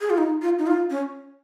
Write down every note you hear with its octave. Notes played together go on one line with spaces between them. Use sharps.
G#4
F4
D#4
F4
D#4
F4
C#4